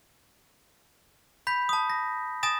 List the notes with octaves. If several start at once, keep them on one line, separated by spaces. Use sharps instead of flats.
B5 G6 B6
A5 D#6
A#6
G#5 D#6 A6 A#6 E7